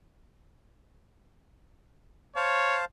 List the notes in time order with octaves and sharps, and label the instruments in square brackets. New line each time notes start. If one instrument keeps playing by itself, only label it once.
[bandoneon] C5 F5 A5 [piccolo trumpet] C#5